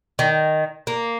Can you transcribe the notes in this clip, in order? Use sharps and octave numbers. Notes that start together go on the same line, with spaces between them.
D#3
A#3